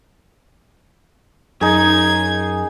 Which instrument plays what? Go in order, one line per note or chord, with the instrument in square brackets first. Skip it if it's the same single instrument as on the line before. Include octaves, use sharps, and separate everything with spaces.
[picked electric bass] F#2 [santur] D#4 G#4 [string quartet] G#6